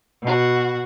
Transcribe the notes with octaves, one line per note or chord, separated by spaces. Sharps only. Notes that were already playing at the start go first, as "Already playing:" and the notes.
B2 F#4